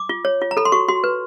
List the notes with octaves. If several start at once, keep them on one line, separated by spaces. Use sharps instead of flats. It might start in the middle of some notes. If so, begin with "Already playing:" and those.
Already playing: D6
F4
C#5
F4
A#5
A4 B5
C6
F#4 C#6
F#4 C6
B4